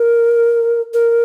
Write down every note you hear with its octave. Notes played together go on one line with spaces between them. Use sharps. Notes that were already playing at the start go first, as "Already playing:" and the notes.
Already playing: A#4
A#4